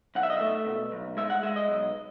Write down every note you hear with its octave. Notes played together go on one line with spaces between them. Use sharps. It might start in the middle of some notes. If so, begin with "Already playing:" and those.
B1 F#5
E5
D#5
A3 E5
B2
B1
G#3 E5
F#5
G#3 E5
D#5
B1